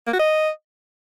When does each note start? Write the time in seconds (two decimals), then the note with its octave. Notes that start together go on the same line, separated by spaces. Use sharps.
0.07 A#3
0.13 F#4
0.19 D#5